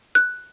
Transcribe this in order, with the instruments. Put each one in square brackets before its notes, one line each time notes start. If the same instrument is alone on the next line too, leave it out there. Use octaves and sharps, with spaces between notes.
[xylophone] F#6